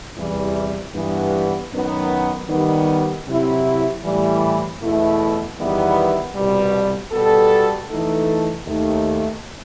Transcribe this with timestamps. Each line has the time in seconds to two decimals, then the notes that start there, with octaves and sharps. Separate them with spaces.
0.17 E2 C3 E3 G3
0.94 G2 E3 B3
1.71 F#2 D#3 F#3 B3 D#4
2.49 D#3 G3 B3
3.26 C3 F#3 C4 E4
4.04 A2 E3 G3
4.80 E2 B2 A3 E4
5.57 E2 D#3 G3 B3 E4
6.34 C2 B2 G3
7.12 B2 G3 B3 F#4 A4
7.89 E3 A3 D#4 A4
8.67 D#2 D#3 A3